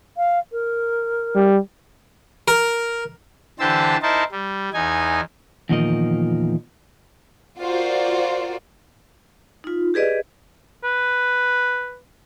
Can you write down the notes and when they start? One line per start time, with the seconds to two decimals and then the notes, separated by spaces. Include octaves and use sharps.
0.17 F5
0.52 A#4
1.35 G3
2.48 A#4
3.60 D3 E3 G4 C5 A5 E6
4.02 D#4 E4 A#4 C5 A5
4.32 G3
4.74 E2 D#4 G#5
5.69 E2 A#2 D#3 F3 A#4 D#5
7.59 F4 F#4 A#4 C5 D5
9.64 D#4 F4
9.94 G4 G#4 B4 D5 D#5
10.84 B4